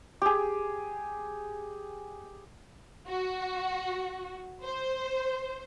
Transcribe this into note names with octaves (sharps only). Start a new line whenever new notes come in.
G4 G#4
F#4
C5